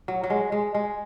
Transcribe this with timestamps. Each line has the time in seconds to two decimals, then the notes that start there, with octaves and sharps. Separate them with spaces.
0.08 F#3
0.24 F#3
0.30 G#3
0.52 G#3
0.74 G#3